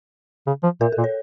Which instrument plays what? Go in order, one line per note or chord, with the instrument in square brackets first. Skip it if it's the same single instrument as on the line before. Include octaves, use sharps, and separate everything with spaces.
[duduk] C#3
F3
[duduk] A#2 [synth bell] A#4
[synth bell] A4
[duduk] A#2
[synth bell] C#5